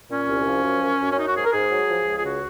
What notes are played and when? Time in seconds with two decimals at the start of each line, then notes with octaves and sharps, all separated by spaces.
0.10 A#2 C#4
0.28 C2
0.46 F3
0.64 F#2
0.82 F#2
1.00 F#2
1.12 C#4
1.17 F#3 D#4
1.27 F#4
1.35 G#2 G#4
1.45 A#4
1.53 G#2 G#4
1.71 F#3
1.89 F3
2.07 C#2
2.16 G#4
2.25 C#3 F#4